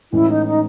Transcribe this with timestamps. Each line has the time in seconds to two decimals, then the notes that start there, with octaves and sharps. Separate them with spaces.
0.12 A2 E3 G#3 C#4 E4
0.30 D#4
0.45 D#4